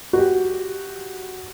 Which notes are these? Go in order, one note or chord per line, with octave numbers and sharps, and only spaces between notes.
F#4 G4